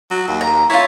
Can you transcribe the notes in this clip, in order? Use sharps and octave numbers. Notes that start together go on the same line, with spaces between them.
F#3
D#2
A#5
E4 F4 C#5